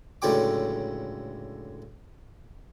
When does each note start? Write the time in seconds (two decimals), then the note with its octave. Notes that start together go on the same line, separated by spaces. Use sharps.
0.22 C#2 A2 D3 F#3 G5 D6